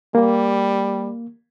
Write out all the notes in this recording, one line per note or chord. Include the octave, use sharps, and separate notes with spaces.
G3 A#3